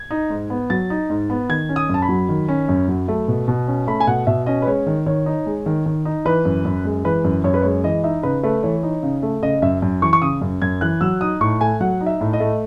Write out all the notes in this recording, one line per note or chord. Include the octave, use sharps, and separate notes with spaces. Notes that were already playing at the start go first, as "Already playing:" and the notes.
Already playing: G#6
D#4
G#2
B3
F#3 A6
D#4
G#2
B3
D#3 G#6
C#4
D#6
F#2 A5
B5
F#3
D#3
C#4
F#2
F#3
A3
B2
B2
C#4
A3 B5
G#5
B2 F#5
B2 E5
C#4 D#5
B4
G#3 C#5
D#3
D#3 C#5
D#4
G#3
D#3
D#3
D#4
E3 B4
F#2
F#2
G#3
E3 B4
F#2
F#2 C#5
B4
G#3 C#5
E3 D#5
D#4 E5
C#3 B4
A3 B4
E3 C#5
D#4
C#3
A3
C#3 D#5
F#2 E5
F#2
E3 C#6
C#6
C#3 D#6
F#2
F#2 G#6
E3 F#6
F#3 E6
D#4 D#6
A2 C#6
A3 G#5
F#3 F#5
D#4
E5
A2
D#5
A3